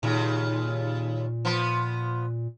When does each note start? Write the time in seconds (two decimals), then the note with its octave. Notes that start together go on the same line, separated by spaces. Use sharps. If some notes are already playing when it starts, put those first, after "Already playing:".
0.03 D#2 A#2 C#3
1.45 F3 B3